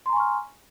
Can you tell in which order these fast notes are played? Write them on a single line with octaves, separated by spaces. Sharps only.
C6 A#5 G#5 C#6 F6